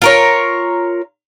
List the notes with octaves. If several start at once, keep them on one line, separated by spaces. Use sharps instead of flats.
F4 A#4 C#5